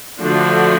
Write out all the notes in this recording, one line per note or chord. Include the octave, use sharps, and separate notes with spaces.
D3 F3 A3 D4 F#4